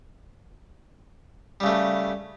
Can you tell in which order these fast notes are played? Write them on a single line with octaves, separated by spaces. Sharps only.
G3 C#3 A3